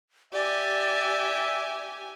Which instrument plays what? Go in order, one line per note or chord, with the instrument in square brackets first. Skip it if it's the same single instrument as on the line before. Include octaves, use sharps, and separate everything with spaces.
[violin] G4 G#5 [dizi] D5 [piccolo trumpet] E5